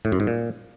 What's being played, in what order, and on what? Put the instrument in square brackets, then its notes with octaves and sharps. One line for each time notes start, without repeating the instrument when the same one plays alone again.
[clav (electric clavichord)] A2
F#2
G#2
A#2